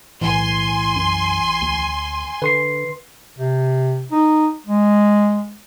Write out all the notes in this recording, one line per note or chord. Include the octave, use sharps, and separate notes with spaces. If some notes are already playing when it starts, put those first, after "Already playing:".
B1 A2 E3 G#5 C6
F#2
D2
D3 B4 C6 C7
C3
D#4
G#3